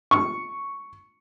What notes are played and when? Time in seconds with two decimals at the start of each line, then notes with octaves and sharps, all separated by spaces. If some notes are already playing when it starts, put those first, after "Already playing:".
0.11 C#6